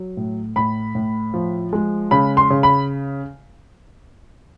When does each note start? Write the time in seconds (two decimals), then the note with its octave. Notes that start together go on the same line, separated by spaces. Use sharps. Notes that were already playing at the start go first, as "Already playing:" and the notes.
Already playing: F#3
0.17 A2
0.56 A2 B5
0.95 A2
1.34 F3
1.73 G#3
2.11 C#3 B5
2.37 C6
2.50 C#3
2.63 B5